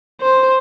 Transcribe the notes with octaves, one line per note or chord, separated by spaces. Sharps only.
C5